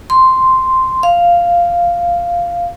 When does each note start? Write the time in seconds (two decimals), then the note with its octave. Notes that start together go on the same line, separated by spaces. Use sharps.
0.10 C6
1.03 F5